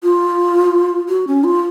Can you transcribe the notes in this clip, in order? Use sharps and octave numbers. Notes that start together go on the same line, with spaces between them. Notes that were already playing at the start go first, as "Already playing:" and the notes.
F4
F#4
C#4
F4